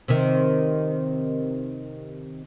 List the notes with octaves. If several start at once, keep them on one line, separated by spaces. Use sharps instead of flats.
C3 D#3